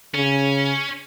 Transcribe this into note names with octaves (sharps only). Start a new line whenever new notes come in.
C#3 C#4